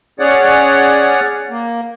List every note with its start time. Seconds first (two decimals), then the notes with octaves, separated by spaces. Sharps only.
0.19 C#4 G#4 C#5 D5 F#5
1.49 A#3